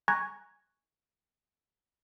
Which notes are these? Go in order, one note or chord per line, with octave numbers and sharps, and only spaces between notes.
G#5 A#5 C#6 F#6 G#6 A#6